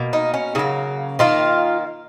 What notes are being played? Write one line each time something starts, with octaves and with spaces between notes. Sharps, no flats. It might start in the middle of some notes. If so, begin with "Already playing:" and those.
Already playing: B2 A#3
D#4
C#4
C#3 F#3 A#3 D#4
D#3 A#3 F4